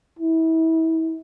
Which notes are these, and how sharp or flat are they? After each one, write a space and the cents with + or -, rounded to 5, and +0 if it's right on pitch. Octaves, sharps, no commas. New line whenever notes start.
E4 -30